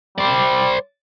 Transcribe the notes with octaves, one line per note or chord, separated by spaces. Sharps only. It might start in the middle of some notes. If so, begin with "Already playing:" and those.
G3 C5 D5